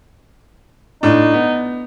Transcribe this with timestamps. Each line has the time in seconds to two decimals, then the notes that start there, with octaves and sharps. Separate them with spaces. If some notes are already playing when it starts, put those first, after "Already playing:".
1.03 A2 D4 D#4
1.34 B3